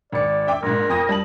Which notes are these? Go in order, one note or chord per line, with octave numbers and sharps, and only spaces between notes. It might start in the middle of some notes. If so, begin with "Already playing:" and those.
G#1 D5 C#7
E5 G5 D6
A#1 G#2 A#4
F2 D#6 A#6
G3 A5 F#7